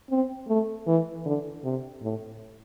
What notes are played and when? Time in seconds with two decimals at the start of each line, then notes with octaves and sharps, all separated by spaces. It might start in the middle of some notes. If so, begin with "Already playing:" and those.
0.10 C4
0.48 A3
0.87 E3
1.26 D3
1.64 C3
2.02 A2